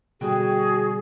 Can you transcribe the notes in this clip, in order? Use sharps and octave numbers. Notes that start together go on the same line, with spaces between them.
B2 D3 G3 F#4 G#4 G5 G#5 F#6